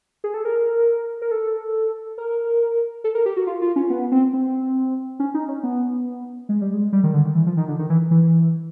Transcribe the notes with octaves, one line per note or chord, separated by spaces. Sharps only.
G#4
A4
A#4
A#4
A4
A#4
A4
A#4
G4
F#4
F4
F4
C#4
B3
C4
C4
C#4
D#4
C#4
B3
G#3
G3
G#3
G3
D#3
D3
D#3
E3
F3
D#3
D3
D#3
E3
E3